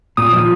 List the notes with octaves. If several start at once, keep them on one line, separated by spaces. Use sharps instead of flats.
A#2 D#6
F3